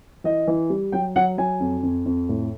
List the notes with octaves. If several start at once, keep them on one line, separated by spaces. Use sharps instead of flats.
E3 D#5
E3
G3
F#3 G5
F#3 F#5
F#3 G#5
F2
F2
F2
A2